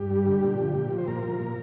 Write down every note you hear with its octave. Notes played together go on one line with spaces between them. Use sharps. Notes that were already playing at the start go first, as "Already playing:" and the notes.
Already playing: G2 G4
G3
D3
A#2
F3
A#2
F3
C5
A#2 A#4
F3
A#2